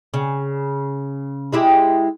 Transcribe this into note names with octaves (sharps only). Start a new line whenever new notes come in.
C#3
G#3 E4 G4